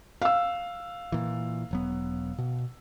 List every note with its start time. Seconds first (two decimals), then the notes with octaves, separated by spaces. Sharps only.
0.22 F5 E6
1.12 A#2 E3
1.71 E1 F#3 B3
2.38 B2